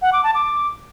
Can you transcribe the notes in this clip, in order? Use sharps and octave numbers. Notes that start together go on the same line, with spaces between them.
F#5
D6
A5
D6